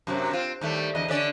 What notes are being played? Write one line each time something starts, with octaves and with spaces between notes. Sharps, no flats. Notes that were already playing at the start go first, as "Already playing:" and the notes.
F#2 C3 F#3
C4 F4
D#2 G3 A3
E2 D3 D#5
D3 C#4 D5